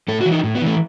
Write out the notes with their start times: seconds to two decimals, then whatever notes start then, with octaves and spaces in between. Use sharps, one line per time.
0.08 A2 A4
0.21 F#4
0.26 E3
0.32 D#4
0.44 A2
0.55 B3
0.62 E3 A3